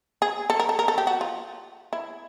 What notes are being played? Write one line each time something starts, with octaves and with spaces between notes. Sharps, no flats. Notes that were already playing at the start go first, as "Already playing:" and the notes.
G#4
A4
A#4
A4
A#4
A4
G4
F#4
F4
E4